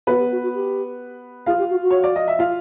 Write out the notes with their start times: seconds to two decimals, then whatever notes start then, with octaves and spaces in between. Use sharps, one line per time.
0.07 B3 F#4 B4
0.19 G4
0.31 F#4
0.43 F#4
0.54 G4
1.46 F4 G#4 F5
1.58 G4
1.70 F#4
1.82 F#4
1.91 C#5
2.04 D5
2.16 D#5
2.28 E5
2.39 F4 F5